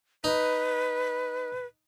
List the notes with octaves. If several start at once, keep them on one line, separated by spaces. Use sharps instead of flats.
D#4 B4